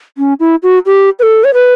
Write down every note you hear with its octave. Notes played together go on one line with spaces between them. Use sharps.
C#4
E4
F#4
G4
B4
A4
C#5
B4